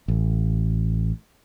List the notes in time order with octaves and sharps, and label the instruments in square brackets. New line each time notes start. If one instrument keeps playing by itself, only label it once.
[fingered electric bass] A1